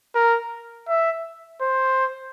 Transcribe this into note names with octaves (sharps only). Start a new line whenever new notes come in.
A#4
E5
C5